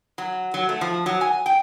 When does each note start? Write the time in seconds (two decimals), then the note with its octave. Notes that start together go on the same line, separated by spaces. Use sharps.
0.18 F#3
0.54 F#3
0.69 A3
0.81 F3
1.06 F#3
1.21 G#5
1.46 G5